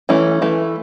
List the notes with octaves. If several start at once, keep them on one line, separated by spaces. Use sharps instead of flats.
E3 A3 C#4
E3 A3